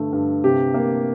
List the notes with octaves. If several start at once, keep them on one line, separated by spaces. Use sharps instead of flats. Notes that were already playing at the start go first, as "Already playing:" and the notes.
Already playing: G2 D3 A3
G2
C3 G4
A#3